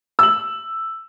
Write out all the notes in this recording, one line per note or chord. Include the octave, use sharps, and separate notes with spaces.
E6 F#7